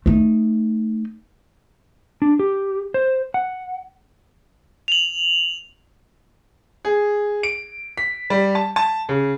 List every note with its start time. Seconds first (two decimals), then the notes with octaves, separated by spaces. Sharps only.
0.06 A3 D#4
2.22 D4
2.39 G4
2.94 C5
3.34 F#5
4.88 F7 F#7
6.85 G#4
7.43 D7
7.98 B6
8.30 G3
8.55 A5
8.76 A5
9.09 C#3